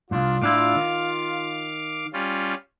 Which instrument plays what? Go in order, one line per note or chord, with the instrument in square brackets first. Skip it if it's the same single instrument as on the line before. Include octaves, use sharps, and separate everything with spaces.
[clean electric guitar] C2 G#2 [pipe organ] D4 [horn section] F4
[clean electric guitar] A2 D4 E4 [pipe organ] F5 D6
[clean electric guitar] D#3
[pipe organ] G3 C#4 F4